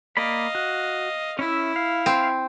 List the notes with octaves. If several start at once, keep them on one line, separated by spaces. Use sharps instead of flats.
A#3 D5 D#5 F5 B5
F#4
C#4 E4 E5
F5
C4